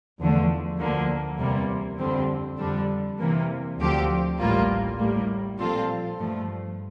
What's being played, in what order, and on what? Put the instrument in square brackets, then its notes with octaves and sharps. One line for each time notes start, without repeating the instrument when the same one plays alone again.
[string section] E2 D3 F3 A3
D2 D3 F3 A#3
E2 C3 G3 A#3
F2 D3 G3 C4
F2 D3 G3 D4
C3 E3 A#3
D2 D3 F3 C4 G4
A1 A2 G3 A#3 F4
A2 G3 A#3
A#2 F3 C4 F4 A4
G2 F3 A3